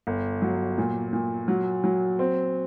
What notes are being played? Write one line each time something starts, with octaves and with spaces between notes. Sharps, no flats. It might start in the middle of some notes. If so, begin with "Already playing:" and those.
G1
F#3
A#2
A#2
F#3
F#3
C4